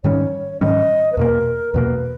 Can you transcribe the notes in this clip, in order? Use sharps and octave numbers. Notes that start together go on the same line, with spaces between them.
G#2 D#3 G3 C#4 C#5
G#2 D#3 G3 C#4 D#5
B4
E2 B2 A#3 A#4
E2 B2 A#3 B4